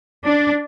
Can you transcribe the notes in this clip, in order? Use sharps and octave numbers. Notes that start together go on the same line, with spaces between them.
D4